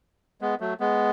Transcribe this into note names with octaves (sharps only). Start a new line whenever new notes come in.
G#3 B3
F#3 A3
G#3 B3